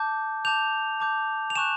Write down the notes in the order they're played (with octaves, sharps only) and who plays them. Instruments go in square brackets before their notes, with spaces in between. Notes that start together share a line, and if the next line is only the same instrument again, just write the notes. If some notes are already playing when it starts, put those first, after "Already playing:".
Already playing: [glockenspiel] A5 D6 G6
A5 D6 G6 F7
A5 D6 G6
F7
G#5 C#6 F#6 E7